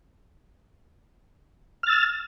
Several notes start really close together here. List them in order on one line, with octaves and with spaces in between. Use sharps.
F6 A6 E6